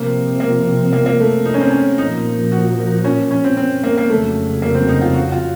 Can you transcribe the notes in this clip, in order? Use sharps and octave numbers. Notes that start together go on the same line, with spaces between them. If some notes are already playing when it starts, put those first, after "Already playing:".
Already playing: C3 F3 A#3 C4
A#3
A#3
A#3
A3
D#4
C#4
C4
C#4
A#2 F3 A#3 D#4
F#4
C#4
C#4
C4
C4
A#3
A#3
F2 C#3 F#3 A3
A#3
C4
D#4
F4
F#4
F4